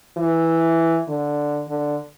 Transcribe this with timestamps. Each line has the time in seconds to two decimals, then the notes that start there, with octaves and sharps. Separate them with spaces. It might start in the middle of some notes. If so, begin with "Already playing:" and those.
0.17 E3
1.08 D3
1.68 D3